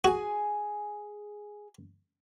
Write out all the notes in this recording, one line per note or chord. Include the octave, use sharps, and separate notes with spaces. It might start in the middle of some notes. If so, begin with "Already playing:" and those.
F#4 G#4 G#5